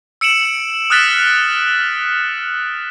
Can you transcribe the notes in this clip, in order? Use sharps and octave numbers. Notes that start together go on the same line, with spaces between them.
E6 C#7 D7 E7 F#7
D#6 F6 F#6 A6 B6 E7